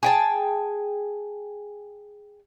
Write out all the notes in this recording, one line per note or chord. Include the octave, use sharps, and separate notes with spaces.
G#4 G5 A5